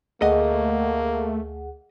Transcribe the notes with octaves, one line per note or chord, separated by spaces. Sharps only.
D2 A3 A#3 G#4 D#5 F#5